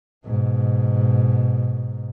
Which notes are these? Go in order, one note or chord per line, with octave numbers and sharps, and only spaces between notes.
G#2 B2